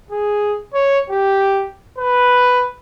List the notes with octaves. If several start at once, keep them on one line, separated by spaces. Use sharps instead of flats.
G#4
C#5
G4
B4